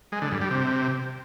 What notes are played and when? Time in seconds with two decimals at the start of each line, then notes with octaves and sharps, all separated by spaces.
0.12 G#3
0.22 D3
0.32 G2
0.41 G3
0.51 C3